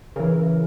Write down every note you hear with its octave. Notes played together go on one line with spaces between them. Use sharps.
C#3 E3 A#4